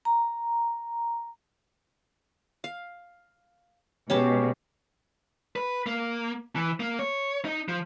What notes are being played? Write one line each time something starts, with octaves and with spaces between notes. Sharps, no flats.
A#5
F5
B2 G#3 C#4 G4 A5
B4
A#3
E3
A#3
C#5
D#4
F3